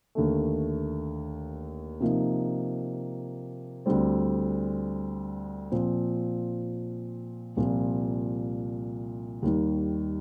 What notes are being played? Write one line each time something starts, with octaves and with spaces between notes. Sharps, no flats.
D#2 D3 A3
C3 F3 A#3 D#4
D2 D3 G3 C4
A#2 F3 C4
C2 A#2 F3
D#2 D#3 G3